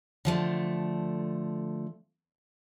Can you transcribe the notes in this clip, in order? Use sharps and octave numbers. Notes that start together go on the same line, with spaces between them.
D3 F3 A3